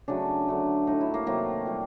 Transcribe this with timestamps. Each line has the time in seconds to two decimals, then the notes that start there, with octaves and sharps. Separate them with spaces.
0.08 C#3 F#3 A3 D4
0.48 D3 F#3 A3
0.87 A2 F#3 A3 D#4
1.01 E4
1.14 A#3
1.26 C3 D#3 F#3 A3 A#3
1.66 A#2 G3